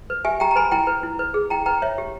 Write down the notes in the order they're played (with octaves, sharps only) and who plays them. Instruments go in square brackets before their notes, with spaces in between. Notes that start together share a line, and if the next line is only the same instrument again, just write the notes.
[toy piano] B4
G4 E5 G#5
G4 G5 A#5
A#5
B4 G#5 B5
E4 G5 A#5
B4
E4
B4
G#4
E4 G5 A#5
B4 G5 A#5
C#5 E5
G4